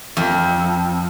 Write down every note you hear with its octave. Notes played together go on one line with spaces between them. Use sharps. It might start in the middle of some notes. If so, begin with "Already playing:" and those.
F2